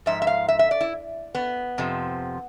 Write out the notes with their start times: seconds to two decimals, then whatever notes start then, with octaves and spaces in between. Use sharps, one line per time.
0.06 G#2 F3 E5
0.22 E5
0.27 F5
0.48 E5
0.59 E5
0.71 D5
0.81 E4
1.35 B3
1.78 F2 C3 F3